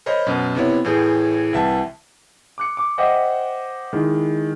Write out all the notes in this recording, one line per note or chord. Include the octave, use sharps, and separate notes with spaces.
A#4 C5 C#5 D#5 B5
F#2 B2
C3 B3 E4 C#5
A2 E3 G#4 G6
C2 E3 E5 G5 A5
D6 F#6 C#7
D6
C5 D#5 E5 F#5 G5 D6
D#3 G#3 E4